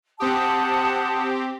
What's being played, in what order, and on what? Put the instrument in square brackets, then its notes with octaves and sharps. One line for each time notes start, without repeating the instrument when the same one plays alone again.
[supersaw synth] C4 G4 [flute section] F#5 A5 D#6